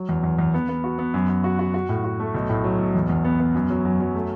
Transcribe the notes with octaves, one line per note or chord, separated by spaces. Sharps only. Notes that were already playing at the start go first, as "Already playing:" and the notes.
Already playing: F#3
E2
E2
E2
B3
B3
F#4
B3
F#2
F#2
F#4
F#4
F#4
A2
F#4
A3
B1
A2
F#3
B1
E2
E2
B3
B3
F#2
F#3
F#2
F#3
A3